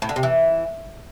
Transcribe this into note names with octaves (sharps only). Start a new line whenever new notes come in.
A2
D3
C3
E3